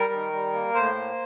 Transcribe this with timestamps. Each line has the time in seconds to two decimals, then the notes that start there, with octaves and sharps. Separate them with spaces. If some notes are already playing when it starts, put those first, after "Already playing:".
Already playing: G3 A#4
0.12 D#3
0.32 G3
0.53 A#3
0.74 A2 C5
0.94 A#3